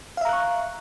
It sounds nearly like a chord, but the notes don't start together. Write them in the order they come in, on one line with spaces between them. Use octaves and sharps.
F5 E5 A#5 F#6 C#6